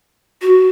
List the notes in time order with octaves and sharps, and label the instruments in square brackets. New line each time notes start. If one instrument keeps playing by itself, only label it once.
[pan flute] F#4